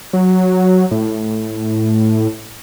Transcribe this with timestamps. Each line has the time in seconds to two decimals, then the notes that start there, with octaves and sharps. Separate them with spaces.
0.13 F#3
0.91 A2